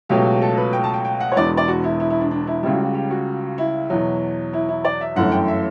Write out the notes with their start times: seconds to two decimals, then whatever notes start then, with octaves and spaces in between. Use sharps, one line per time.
0.09 C#2 B2 F#3 A3 G4
0.42 A4
0.57 B4
0.73 G5
0.84 A5
0.94 G5
1.05 G5
1.20 F#5
1.32 C#5
1.36 E1 E2 B2 D5
1.57 D5
1.68 F#4
1.84 E4
2.00 E4
2.10 E4
2.21 D4
2.31 D4
2.47 E4
2.63 C#2 C#3 G3 E4
2.73 F#4
2.84 F#4
2.94 G4
3.11 F#4
3.58 E4
3.90 E2 B2 F#3
4.53 E4
4.69 E4
4.85 D5
5.01 E5
5.16 G1 F#2 E3 A3 F#5
5.32 G5
5.48 E5